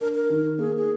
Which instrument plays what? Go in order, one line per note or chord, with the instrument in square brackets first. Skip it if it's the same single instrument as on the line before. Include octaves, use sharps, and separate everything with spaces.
[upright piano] D4 [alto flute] A#4
[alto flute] A#4
[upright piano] D#3
[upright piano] A#3 [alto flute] G#4
[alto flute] G#4